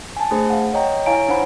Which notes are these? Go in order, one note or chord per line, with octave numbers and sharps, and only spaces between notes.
G#5 A5
A3 D4 G#4 C5
F5 F#5
C#5 D#5 G5 A#5
E4 C#5 F5 G#5 A#5 D7
D4 D#4 C5 F#5 B5